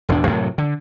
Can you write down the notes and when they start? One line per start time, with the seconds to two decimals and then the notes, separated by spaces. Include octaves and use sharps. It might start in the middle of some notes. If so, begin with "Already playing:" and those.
0.09 E1 E2 A2 D4
0.27 F#2 A2 C3 F#3
0.58 D3